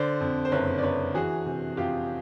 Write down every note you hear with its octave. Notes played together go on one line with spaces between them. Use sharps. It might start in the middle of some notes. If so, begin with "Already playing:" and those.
Already playing: D3 C5 D5
F2
C5
F#1 B4 C#5
D5
F#1 B4 C#5
E3 F#4 G#4
C3
F2 F4 G4